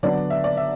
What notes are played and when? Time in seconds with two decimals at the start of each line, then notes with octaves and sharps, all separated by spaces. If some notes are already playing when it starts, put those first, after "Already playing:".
0.03 D3 F#3 B3 D4 D5
0.30 E5
0.44 D5
0.57 E5